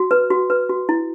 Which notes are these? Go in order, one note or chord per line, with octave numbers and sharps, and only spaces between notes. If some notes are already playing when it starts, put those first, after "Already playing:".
Already playing: F#4
B4
F#4
B4
F#4
E4